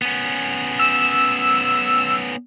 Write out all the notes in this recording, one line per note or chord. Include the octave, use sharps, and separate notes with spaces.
B3 C#4
E6